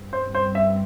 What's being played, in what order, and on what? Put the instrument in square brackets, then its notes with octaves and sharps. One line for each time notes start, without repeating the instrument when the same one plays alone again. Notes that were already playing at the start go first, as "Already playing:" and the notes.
Already playing: [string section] G2 G3 C4
[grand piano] C5
C5
E5